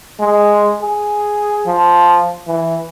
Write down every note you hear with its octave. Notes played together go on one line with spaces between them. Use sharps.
G#3
G#4
F3
E3